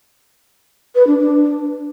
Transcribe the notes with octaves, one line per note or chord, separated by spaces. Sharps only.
B4
D4
D4